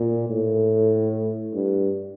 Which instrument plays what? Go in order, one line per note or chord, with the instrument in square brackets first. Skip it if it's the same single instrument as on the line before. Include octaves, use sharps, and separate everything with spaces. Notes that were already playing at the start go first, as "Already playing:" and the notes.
Already playing: [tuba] A#2
A2
G2